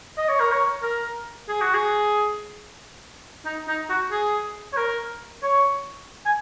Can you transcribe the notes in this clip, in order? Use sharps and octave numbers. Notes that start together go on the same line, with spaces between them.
D#5
C#5
A#4
C#5
A#4
G#4
F#4
G#4
D#4
D#4
F#4
G#4
C#5
A#4
C#5
G#5